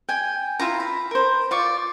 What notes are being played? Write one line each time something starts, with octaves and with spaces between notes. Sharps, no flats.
G5 G#5
E4 F4 A#5
B5
A#4 C5
F4 D5 C#6